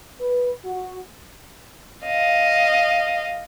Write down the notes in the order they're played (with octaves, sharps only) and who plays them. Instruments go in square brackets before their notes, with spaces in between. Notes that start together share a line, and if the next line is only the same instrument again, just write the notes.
[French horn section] B4
F#4
[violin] D#5 F5